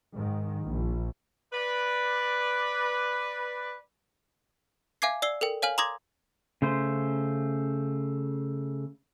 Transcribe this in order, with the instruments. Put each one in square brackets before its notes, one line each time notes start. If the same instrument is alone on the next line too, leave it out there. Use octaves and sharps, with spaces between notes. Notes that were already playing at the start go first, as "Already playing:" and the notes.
[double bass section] G#2 D#3
A#1
[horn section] B4 D5
[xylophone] E5 F5 G#5 D6 G#6 C7
D5 E6 C7 G7
A4 A#4 G5
C#5 F5 G#5 F6 F#7
A#5 C6 D6 D#6 G#6 A#6
[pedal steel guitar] C#3 A3 C5